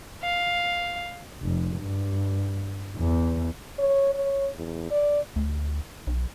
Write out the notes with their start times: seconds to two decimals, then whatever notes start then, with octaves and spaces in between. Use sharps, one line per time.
0.23 F5
1.41 F1
1.78 G2
2.97 E2
3.79 C#5
4.14 C#5
4.56 E2
4.91 D5
5.36 D2
6.07 B1